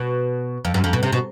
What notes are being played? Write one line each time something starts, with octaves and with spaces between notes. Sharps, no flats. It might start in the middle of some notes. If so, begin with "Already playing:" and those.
Already playing: B2
F2
F#2
F2
B2
C3
B2